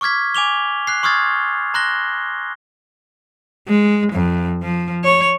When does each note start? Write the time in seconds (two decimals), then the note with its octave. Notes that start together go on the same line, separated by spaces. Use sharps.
0.01 C#6 D6 F6 G#6 B6
0.35 G#5 D6 F7 G7
0.87 F#6 C7
1.03 C6 C#6 D#6 F6 G#6 A6
1.74 A#5 C6 F#6 A#6 G7
3.68 G#3
4.12 F2
4.62 F3
5.04 C#5